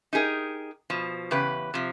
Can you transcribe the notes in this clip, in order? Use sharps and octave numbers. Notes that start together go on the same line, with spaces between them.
D#4 G4 G#4 A#4
B2 F3
E2 C#3 G4 B4
C3 F3